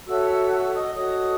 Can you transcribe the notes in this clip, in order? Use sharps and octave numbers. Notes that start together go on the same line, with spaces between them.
F#4 A4 C#5 E5 E6
E5 E6
E5 E6
D#5 D#6
F#4 A4 C#5 D#5 D#6